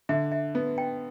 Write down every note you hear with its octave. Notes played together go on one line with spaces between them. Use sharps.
D3 E5
E5
B3
G5